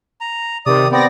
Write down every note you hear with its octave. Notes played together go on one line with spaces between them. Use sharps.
A#5
C3 D#3 D5 D#6
B3 C4 D5 A#6